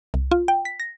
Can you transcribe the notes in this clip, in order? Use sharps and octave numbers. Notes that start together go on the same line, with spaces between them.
C2
F4
G5
B6
A#6